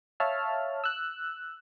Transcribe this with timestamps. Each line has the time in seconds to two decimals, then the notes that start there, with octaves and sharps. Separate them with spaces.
0.20 C#5 E5 F5 A5 F6
0.84 E6 F#6